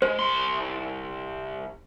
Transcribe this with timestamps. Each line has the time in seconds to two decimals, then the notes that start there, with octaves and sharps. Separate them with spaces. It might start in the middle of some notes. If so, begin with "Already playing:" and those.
0.02 G#3 C5
0.19 C2 C6